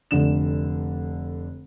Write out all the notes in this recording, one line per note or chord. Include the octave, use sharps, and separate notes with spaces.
F1 D3 E7